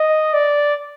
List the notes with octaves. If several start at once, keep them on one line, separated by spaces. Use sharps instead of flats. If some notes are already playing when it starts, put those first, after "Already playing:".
Already playing: D#5
D5